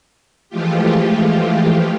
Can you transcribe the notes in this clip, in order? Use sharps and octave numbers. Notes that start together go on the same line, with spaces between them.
E3 F3 G#3 A3 F4 G4